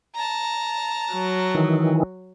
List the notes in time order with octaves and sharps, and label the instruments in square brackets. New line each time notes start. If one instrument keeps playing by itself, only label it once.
[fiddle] A5 A#5
[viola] F#3
[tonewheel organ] D#3 E3